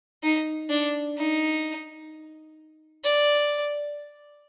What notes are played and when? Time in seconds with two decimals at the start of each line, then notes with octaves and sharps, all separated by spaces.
0.23 D#4
0.70 D4
1.17 D#4
3.04 D5